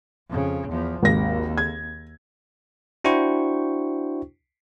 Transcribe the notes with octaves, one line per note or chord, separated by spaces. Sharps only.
F2 C#3
E2 F3
G#1 D#2 A#6
G#6
D4 E4 F#4 C5 G5 C#6